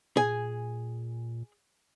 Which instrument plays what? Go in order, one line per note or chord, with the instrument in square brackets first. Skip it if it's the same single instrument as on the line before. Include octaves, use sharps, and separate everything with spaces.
[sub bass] A#2 [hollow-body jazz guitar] G#4 G#5